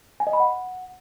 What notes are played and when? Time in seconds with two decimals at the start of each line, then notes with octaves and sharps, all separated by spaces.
0.20 G#5
0.27 D#5
0.33 B5
0.40 F#5